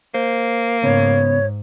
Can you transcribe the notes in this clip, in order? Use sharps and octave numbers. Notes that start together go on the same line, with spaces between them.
A#3 C5
G#2 C#3 B3 C#5